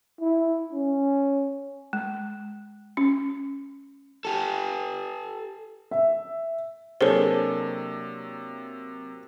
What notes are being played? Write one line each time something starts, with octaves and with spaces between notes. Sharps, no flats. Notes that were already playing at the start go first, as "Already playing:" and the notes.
E4
C#4
G#3
C#4
G4 A4
E5
C3 F#3 A#3 D4 G#4 A4 C5 C#5